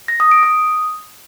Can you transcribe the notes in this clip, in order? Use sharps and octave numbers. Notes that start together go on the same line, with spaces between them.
A#6
D#6
D7
D#6